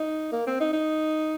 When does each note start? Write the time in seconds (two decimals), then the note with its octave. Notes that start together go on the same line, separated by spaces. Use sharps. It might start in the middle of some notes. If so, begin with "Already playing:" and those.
Already playing: D#4
0.32 A#3
0.47 C4
0.60 D#4
0.73 D#4